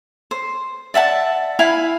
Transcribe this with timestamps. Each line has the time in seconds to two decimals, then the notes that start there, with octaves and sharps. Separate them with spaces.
0.31 C5
0.94 D5 E5 F#5 A5
1.59 E4 F5 G#5 B5